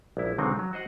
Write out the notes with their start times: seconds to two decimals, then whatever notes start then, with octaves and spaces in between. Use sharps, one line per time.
0.17 A#1 E4
0.38 B1 D3 D#3 G#3 C4 D#4
0.59 F#3
0.73 F#4 C5 D#5 F#5